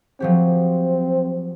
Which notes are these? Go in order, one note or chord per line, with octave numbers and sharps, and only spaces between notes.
F3 F#3 C4 G4